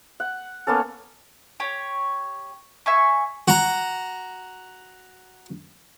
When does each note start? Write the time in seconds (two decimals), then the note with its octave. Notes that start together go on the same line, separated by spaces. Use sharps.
0.20 F#5
0.67 A#3 B3 C#4 A4
1.60 G4 C#5
2.86 E5 G#5 C#6
3.48 F#4 A#5